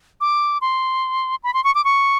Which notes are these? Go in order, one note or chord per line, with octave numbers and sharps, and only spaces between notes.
D6
C6
B5
C6
C#6
D6
C#6